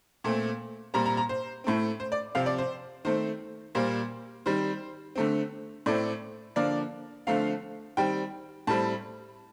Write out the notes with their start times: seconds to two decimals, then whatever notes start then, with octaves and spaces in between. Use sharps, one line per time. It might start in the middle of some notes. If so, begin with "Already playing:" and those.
0.24 A#2 A3 C4
0.94 A#2 G3 C4 A#5
1.06 A#5
1.17 A#5
1.29 C5
1.64 A2 A3 C4
2.00 C5
2.12 D5
2.35 C3 F3 C4 F5
2.46 D5
2.58 C5
3.05 D#3 A3 C4 C5
3.75 A#2 G3 A#3 C5
4.46 D#3 G3 C4 C5
5.16 D3 A3 C4
5.86 A2 A3 C4 D5
6.56 D3 F3 A#3 D5
7.27 D3 F3 A3 C4 F5
7.97 D#3 G3 C4 G5
8.67 A2 G3 C4 A5